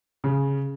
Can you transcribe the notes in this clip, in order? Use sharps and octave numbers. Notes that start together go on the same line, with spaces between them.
C#3